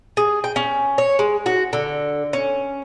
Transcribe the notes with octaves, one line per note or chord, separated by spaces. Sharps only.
G#4
G5
C#4
C#5
G#3
F#4
D3
C#4